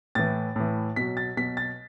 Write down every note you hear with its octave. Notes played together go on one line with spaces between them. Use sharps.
A2 E3 A6
A2 E3
B2 F#3 B6
A6
B2 F#3 B6
A6